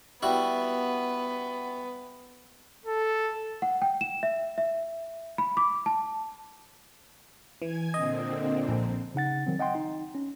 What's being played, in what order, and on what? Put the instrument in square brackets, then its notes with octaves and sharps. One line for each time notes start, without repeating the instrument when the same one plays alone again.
[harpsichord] G3 E4 F#4 [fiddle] B3
[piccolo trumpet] A4
[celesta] F#5
G5
E7
E5
E5
B5
D6
A5
[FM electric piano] E3 [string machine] G#5 G#6
[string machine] A#2 D3 C4 [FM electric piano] D#5
[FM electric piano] A#1
[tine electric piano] C#3 D#4 F#5 A6
D#3 F#3 C4
D#5 F#5 G5 C6
D#4
C#4